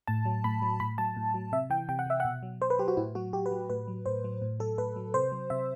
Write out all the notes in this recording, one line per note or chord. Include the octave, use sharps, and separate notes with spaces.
A2 A5
F#3
A2 B5
F#3
A2 B5
F#3 A5
A2
F#3
C3 E5
E3 G5
C3 G5
F#5
E3 E5
B2 F#5
F#3
B2 C5
B4
F#3 G4
F#4
A2 E4
F#3 F#4
A2 G4
B4
F#3
A2 B4
F#3
A2 C5
F#3
A2
F#3 A4
A2 B4
F#3
C3 C5
F#3
C3 E5